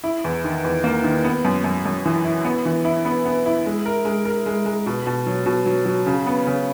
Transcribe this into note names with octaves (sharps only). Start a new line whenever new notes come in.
E4
E2
D#3
E2
A#3
D#3
B3
F#2
F#2
F#2
E3
E4
B3
E3
E4
B3
B3
E4
G#3
A#4
G#3
A#4
G#3
G#3
B2
B2
F#3
B2
F#3
F#3
C#3
B3
C#3